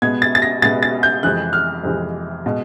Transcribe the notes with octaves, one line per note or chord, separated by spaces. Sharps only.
B2 G#3 B3 G#6
A6
A6
A#6
B2 G#3 B3 A6
A6
G6
F2 C3 E3 G#3 F#6
F6
F2 C3 E3 G#3
B2 G#3